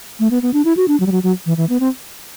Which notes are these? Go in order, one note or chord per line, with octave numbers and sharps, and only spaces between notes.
A3
B3
B3
D4
E4
F#4
D4
F#3
G3
F#3
F#3
E3
E3
B3
C4